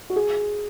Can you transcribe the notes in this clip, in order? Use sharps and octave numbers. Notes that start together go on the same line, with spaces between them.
F#4
G#4